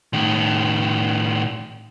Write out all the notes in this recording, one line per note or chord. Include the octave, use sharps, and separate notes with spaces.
A2 D#3